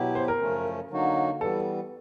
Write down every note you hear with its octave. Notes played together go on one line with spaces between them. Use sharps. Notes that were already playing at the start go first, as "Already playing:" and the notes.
Already playing: B2 F#3 B3 E4 G4
C5
A#4
F#2 C#3 F3 A3 C#4
D3 F#3 A#3 D#4 F#4
E3 G3 B3 A4